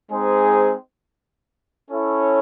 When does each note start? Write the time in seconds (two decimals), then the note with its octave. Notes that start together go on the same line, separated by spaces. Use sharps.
0.11 G#3 C4 D#4 G#4 C5
1.91 C#4 E4 A4 C#5